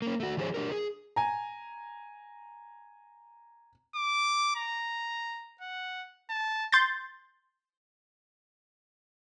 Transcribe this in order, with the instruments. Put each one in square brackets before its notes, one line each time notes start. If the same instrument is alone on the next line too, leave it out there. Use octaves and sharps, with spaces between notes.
[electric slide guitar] A#3 C#4
A3 F#4
D#3 F3 G4 G#4 C5 C#5
D4 G4 A#4
G#4
[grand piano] G#5 A#5
[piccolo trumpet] D6
A#5
F#5
A5
[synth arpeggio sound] C6 G6 A6